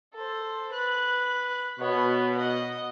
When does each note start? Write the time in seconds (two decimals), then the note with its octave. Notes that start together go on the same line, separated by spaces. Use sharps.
0.14 A4 C5
0.72 B4 F#6
1.79 B2 B3 C#5
2.38 D#5 F#5